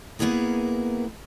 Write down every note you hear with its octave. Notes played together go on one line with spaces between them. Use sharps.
A#3 B3 E4 G#4 A#4